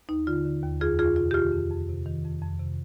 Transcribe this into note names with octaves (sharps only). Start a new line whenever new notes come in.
D#2 D#4
D3 F4
D3
D#2
F2 F4 G#4
F2 F4 G#4
C3 F4
G4
D#3 F4
F2
F2
C3
D#3
F2
F2
C3